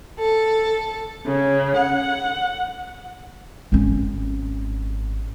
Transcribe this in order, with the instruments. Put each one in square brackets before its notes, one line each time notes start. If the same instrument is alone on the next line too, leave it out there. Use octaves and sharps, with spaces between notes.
[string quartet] A4
C#3
F#5
[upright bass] G#1 C#4